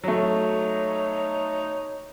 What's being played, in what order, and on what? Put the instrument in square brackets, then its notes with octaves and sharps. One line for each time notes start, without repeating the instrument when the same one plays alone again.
[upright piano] F#3 A3 [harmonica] D#4 C#5